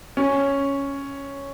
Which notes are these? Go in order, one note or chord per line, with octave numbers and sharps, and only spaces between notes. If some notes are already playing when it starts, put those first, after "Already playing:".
C#4